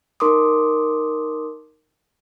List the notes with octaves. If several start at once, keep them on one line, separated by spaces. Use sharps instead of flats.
D#4 A#4 C6 D6 D#6